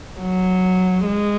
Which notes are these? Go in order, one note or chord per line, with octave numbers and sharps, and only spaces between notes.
F#3
G#3